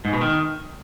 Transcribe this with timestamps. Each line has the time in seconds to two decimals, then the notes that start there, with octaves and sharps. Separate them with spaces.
0.05 G#2
0.13 B2
0.21 D#3